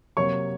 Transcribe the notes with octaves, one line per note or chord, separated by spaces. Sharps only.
C3 F#3 A#3 C#5 C#6